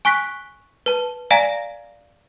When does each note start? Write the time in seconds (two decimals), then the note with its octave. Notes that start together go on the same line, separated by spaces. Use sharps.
0.05 G#5 C#6 F#6 B6
0.86 B4 A5
1.31 D5 F5 G#5 A#5 A#6